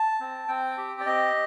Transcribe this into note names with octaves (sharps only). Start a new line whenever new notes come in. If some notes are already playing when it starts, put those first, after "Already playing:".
Already playing: A5
C4
C4 G5
G4
D5
C4 D#5